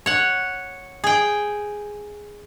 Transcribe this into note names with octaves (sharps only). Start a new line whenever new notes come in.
C#5 F#5
G#4 G5